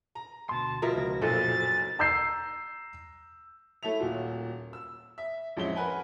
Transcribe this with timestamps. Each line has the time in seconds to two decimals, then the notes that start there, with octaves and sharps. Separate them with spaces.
0.15 A#5
0.49 D2 B2 A5 C6
0.82 B2 F3 E4 A#4 A#6
0.97 C#2
1.22 F#1 B1 A#2 F3 A4 A6
1.99 A#5 E6 G6 C7
3.83 A3 E4 A4 C#5 E5 F7
3.99 D#1 A#2 F#4
4.73 E6
5.18 E5
5.57 A1 F2 G#3 C#4 E5 G7
5.76 A#4 B4 F#5 G#5 A5 B5